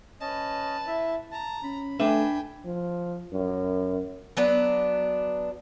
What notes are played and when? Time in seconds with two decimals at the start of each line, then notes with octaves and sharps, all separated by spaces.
0.21 C#4 B4 D#5 A5
0.87 E4 E5
1.32 A5 A#5
1.63 C#4 B5
2.00 A3 D4 B4 E5 G5 G#5
2.65 F3
3.33 F#2
4.37 F#3 B3 D4 B4